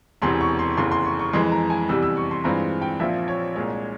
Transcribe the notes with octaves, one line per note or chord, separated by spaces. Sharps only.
E1 E2 C3 E3 C6
C#6
C6
F1 E2 C#3 E3 C6
C6
C#6
C#6
F2 E3 G#3 C6
A#5
G#5
E2 C3 E3 G3 E6
E6
C#6
C6
G2 E3 G#3 C4 F4 A#5
G5
A#1 A#2 F3 C4 F4 E5
C#5
C2 A#2 G#3 C#5